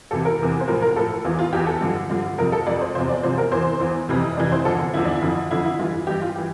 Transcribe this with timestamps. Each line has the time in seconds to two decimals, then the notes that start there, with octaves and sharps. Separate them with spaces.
0.11 E2 C3 E3 A4
0.25 A#4
0.39 E2 C3 E3
0.60 C5
0.68 A2 F3 A#4
0.82 A#4
0.96 A2 F3 A4
1.25 E2 E3 F4
1.39 F4
1.52 E2 E3 G4
1.66 A4
1.81 G2 D3 F3
2.10 G2 D3 F3
2.38 F2 C3 F3 A#4
2.52 A4
2.66 F2 C3 F3 D5
2.81 C5
2.95 E2 C3 F3 C5
3.09 D5
3.23 E2 C3 F3 C5
3.38 A#4
3.51 E2 E3 C5
3.80 E2 E3
4.09 F2 C3 E3
4.36 F2 C3 E3 D5
4.52 C5
4.65 E2 D3 F3 A4
4.94 E2 D3 F3 E4
5.04 D4
5.13 E4
5.22 F2 D3 F3
5.51 F2 D3 F3 E4
5.65 E4
5.79 G2 E3 F4
6.07 G2 E3 G4
6.21 F4
6.36 E3 G4